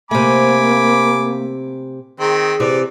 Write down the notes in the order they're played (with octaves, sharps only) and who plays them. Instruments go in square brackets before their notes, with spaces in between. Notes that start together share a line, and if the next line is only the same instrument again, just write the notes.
[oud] C3 A3 [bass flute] A#3 [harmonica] G#5 B5 D6
[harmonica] D#3 C4 [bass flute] G#4
[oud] C3 E3 [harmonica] D5